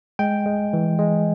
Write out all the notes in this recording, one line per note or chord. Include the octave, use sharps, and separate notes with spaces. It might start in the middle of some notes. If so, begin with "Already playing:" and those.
G#3 G5
G#3
E3
G#3